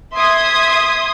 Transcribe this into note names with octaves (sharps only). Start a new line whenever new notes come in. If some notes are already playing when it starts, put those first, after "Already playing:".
E5 C6 D#6 G#6